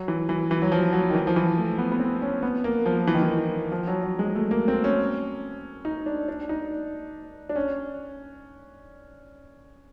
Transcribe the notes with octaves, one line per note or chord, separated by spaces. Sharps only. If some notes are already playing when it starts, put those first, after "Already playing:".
Already playing: F#3
E3
E3
E3
F#3
F3
F#3
D#3
E3
F3
E3
A3
B3
B3
C4
C#4
B3
A#3
F3
E3
D#3
E3
F3
F#3
F#3
G#3
A3
A#3
C4
C#4
D#4
D4
D4
D#4
D4
C#4